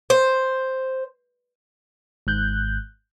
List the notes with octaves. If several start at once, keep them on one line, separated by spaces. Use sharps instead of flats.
C5
G#1 G#2 F#6 G6